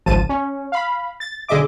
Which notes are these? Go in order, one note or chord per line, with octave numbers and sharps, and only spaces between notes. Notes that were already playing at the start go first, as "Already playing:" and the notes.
G#1 C#2 F3 A5 D#7
C#4
F5 B5
A6
B1 D3 G#4 D#5 E5 D6